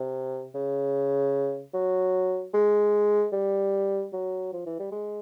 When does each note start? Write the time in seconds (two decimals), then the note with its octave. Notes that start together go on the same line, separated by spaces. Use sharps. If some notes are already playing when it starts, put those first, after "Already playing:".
Already playing: C3
0.55 C#3
1.74 F#3
2.54 G#3
3.33 G3
4.13 F#3
4.53 F3
4.66 E3
4.79 G3
4.92 G#3